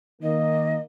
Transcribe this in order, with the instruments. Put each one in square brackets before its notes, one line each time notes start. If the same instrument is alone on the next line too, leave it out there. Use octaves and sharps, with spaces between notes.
[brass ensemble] D#3 A#3 [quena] D#5